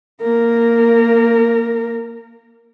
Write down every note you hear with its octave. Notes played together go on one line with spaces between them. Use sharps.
A#3 A#4